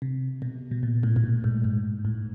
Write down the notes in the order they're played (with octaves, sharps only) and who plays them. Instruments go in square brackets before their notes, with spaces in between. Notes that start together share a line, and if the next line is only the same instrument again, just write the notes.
[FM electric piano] C3
B2
B2
A#2
A2
A2
A#2
G#2
G#2
A2